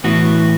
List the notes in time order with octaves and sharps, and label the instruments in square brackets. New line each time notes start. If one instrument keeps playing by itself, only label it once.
[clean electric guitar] A2 E3 B3 F#4